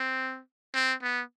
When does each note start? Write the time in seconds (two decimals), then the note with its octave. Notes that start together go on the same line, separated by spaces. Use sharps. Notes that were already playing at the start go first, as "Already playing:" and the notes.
Already playing: C4
0.74 C4
1.02 B3